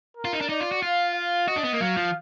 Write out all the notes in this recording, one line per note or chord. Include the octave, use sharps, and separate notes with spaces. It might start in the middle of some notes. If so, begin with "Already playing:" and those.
A#4
F4
D#4
D4
D#4 D5
F4
F#4
F4 F5
F5
F#4 D#5
D4
B3
A#3
F#3 F5
F3